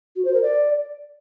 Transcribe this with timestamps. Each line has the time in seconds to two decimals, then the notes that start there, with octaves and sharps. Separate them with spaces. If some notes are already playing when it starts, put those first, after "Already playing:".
0.16 F#4
0.25 C5
0.34 A#4
0.43 D5